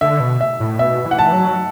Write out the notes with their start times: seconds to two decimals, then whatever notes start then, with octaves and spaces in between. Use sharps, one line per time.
0.01 D3 E5
0.20 B2
0.41 E5
0.60 A2
0.79 B2 E5
1.06 E3
1.11 F#5
1.19 A5
1.32 F#3